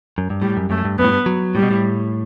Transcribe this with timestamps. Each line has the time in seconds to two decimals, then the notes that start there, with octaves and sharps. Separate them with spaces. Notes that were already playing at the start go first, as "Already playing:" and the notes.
0.18 F#2
0.30 G2
0.42 A2 G3
0.57 F#2
0.70 F#2 A3
0.85 G2
0.99 F#2 B3
1.04 A2
1.08 G2
1.26 F#3
1.55 A2 G3
1.62 B2
1.71 A2